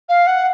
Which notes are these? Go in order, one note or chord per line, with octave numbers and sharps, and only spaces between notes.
F5
F#5